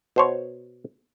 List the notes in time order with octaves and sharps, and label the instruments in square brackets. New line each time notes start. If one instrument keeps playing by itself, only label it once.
[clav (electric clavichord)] B2 C5 C#5